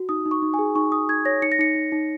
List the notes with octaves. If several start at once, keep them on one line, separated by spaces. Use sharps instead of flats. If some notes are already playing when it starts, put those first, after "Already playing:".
Already playing: F#4
D#4 D#6
D#4
C#6
D#4
G#5
G#4
D#4 C#6
D#4 D#6
D#4 G#6
C#5 A#6
D#4 C#7
A#6
D#4 C#7
D#4
D#4